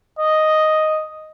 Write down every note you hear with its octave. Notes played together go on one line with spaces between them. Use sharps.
D#5